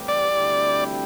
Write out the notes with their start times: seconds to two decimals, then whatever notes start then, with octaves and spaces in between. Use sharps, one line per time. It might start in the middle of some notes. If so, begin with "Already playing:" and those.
Already playing: A2 E3 G3 C4 G4
0.08 D5
0.30 D2 C3 G3 E4 G4